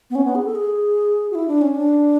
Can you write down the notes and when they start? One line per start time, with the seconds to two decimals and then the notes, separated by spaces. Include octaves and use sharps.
0.10 B3
0.15 C#4
0.25 B3
0.35 G#4
0.45 A4
0.55 G#4
1.31 F#4
1.35 E4
1.48 D4
1.61 C#4
1.75 D4